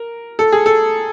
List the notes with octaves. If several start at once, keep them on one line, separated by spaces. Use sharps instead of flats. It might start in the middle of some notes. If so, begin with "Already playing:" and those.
Already playing: A#4
A4
G#4
A4